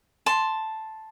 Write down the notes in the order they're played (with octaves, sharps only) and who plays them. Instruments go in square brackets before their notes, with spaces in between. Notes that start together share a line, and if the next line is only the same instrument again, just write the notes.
[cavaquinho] A5 C6